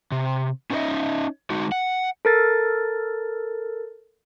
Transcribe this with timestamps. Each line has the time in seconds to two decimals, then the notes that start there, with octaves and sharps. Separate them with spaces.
0.12 C3
0.70 C#4 D#4 A4 B4 D#5 E5
1.50 G#3 D#4 F#4
1.72 F#5
2.25 A4 A#4 A6